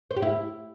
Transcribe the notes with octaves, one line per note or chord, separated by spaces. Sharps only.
C5
G4
E4